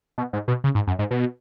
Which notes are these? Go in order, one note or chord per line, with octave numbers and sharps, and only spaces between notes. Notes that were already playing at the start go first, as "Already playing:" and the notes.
B2
G#2
B2
C#3
G#2
F#2
G#2
B2